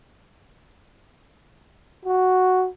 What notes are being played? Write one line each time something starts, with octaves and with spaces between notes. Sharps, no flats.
F#4